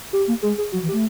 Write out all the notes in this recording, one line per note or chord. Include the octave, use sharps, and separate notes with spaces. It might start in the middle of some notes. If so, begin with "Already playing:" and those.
G4
A#3
G#3 G#4
G#4
F#3 F#4
E3
G4
A3